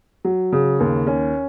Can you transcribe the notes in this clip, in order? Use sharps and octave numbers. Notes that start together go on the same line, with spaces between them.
F#3
C#3
D#2
C#4